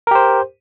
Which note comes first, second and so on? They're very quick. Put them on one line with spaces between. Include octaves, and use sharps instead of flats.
A#4 G4 C5